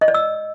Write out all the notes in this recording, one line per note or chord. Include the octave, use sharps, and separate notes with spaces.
D#5
D5
E6